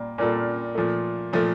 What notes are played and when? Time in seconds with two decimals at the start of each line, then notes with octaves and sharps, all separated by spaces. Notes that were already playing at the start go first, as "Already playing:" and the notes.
Already playing: A#2 G3 A#3 F4
0.18 A#2 G3 A#3 F4 A4
0.75 A#2 F3 A3
1.33 A#2 F3 A3